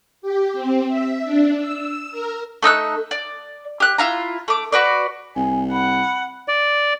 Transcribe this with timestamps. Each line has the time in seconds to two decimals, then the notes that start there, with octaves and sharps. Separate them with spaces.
0.22 G4
0.53 C4
0.87 E5
1.24 D4
1.58 E6
2.11 A#4
2.62 A3 D#4 E6 F#6
3.11 D5
3.80 G4 F#6
3.98 E4 F4 A#5
4.48 A3 D6
4.72 F#4 B4 D5
5.36 C2 G#5
5.72 F#5 B5
6.48 D5